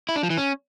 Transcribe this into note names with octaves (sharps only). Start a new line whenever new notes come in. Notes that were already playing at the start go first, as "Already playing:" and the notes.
E4
D4
F3
E3
C#4